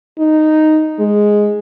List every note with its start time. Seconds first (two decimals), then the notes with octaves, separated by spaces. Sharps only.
0.19 D#4
0.99 G#3